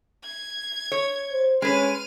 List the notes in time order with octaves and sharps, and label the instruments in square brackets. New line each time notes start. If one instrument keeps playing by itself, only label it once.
[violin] G#6
[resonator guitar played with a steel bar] C#5
[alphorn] C5
[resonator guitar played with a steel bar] G#3 B4 [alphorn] C#4 [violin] F6 D#7